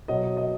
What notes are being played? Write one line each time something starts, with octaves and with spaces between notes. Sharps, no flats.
B2 F#3 D#5
D#5